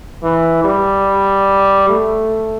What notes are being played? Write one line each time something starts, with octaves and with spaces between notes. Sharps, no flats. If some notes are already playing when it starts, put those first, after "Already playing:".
E3
G3
A3